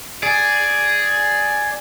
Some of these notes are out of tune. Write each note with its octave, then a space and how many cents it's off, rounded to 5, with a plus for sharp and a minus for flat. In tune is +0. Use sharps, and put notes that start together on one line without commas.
G#4 +5 D5 +0